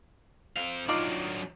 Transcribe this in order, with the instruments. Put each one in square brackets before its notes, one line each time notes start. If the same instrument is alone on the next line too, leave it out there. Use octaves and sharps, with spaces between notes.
[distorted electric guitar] C4 F5
[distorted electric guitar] F#3 D4 [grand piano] D#4 F4 D6